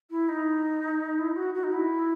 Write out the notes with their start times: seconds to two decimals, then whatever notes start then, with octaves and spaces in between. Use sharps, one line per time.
0.10 E4
0.28 D#4
1.18 E4
1.36 F#4
1.54 F#4
1.63 D#4
1.72 E4